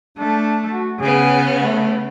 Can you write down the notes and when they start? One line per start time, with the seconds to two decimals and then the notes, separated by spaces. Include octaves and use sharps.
0.18 A3 D4
0.68 F#4
1.00 C#3 B3 G#4
1.61 A3